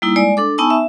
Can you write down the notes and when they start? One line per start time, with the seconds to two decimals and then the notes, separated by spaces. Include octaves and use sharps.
0.02 G3 A#3 D#4 E4
0.16 G#3 D5 G#5
0.37 D4 A4 D6
0.58 B3 D#4 G#5 A5 C#6 E6
0.70 E5